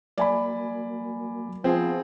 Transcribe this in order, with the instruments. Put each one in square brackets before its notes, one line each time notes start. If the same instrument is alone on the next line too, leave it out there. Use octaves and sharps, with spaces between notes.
[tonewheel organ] F#3 A#3 [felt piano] D5 G#5 B5
[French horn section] F3 B3 [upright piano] C4 G#4